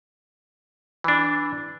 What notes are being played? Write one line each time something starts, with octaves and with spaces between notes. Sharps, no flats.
E3 D4